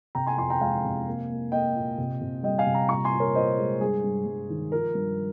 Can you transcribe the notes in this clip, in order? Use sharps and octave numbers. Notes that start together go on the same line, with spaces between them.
C3 G5 A#5
G#5 C6
F2 G#5 C6
G5 A#5
G#3 F5 G#5
C3
A#3
A#3
A#3 D#5 G5
A#2
C3
C3
G3 D#5 G5
F5 G#5
C3
G5 A#5
A#2 A#5 C#6
G#5 C6
A#2
A#4 C#5
A#2 C5 D#5
G#3
G2 G#4
G2
G2
D#3
F3 A#4
G2